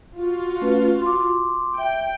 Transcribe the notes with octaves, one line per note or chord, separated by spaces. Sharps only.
F4 F#4
A3 C#4 B4
C6 D6
E5 G5